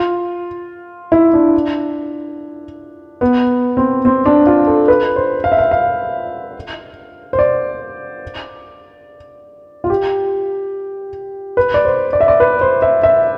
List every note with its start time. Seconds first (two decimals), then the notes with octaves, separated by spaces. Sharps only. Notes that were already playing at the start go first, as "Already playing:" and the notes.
Already playing: F4
1.12 E4
1.33 D4
3.21 B3
3.77 C4
4.05 C4
4.26 D4
4.47 F4
4.67 A4
4.88 B4
5.16 C5
5.44 F5
5.52 E5
5.58 F5
5.71 F5
7.33 C5
7.39 D5
9.84 F4
9.90 G4
11.57 B4
11.74 D5
11.85 C5
12.13 D5
12.21 E5
12.28 D5
12.40 B4
12.61 C5
12.82 E5
13.03 E5